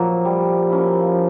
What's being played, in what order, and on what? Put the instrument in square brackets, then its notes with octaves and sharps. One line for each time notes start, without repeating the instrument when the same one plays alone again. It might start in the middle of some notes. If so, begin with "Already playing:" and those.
Already playing: [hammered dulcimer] A#2 F#3 A#3 [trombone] F3
[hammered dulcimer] G3
A#3 C#4 E4